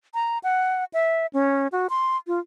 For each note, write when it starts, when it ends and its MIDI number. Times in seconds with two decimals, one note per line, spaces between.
0.14 0.38 82
0.44 0.85 78
0.93 1.26 76
1.33 1.68 61
1.72 1.87 66
1.90 2.17 84
2.27 2.39 65